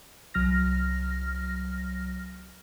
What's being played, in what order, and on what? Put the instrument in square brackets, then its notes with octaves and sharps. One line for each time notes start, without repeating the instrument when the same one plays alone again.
[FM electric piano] C2 F#3 F6 A#6